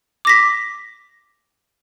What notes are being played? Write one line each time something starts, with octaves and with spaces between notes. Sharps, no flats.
D6 A#6 B6